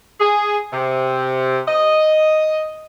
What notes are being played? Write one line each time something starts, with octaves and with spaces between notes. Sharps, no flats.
G#4
C3
D#5